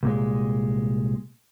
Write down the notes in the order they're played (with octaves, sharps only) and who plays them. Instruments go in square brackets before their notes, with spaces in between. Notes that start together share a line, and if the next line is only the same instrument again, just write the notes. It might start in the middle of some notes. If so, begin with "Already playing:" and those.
[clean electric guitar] C2 A#2 G#3